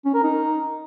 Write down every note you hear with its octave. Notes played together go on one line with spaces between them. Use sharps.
C#4
A#4
D#4